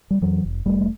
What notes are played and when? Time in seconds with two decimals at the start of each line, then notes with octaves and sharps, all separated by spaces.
0.11 G3
0.21 F2 E3 F#3
0.44 F1
0.65 F1 G3 A3
0.81 A3